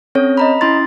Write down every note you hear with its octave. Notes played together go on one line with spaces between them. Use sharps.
C4 C#4 A4 C#5
D#5 A#5 B5
C#4 E4 C6 A6